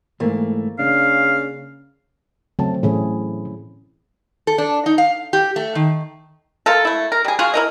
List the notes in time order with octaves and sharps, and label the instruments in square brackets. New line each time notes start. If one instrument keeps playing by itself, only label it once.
[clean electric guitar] G#2 E3 A3 [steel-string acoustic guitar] A#3
[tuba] C#3 [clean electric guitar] D4 [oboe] F5
[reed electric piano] C#3 A5 [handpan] F#3 A3 C4
[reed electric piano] A2 E3 [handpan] C#4 E4 G#4
[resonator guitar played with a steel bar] A4
D4
D#4
F5
G4
A3
D#3
[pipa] A#3 F4 A4
A3 E4
A#4
G3 G#4
F4 F#4 G#4
E4 A#4 D#5